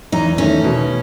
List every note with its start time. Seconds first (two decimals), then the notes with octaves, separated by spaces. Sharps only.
0.12 E2 D#4
0.38 D#3 A3 C#4
0.64 B2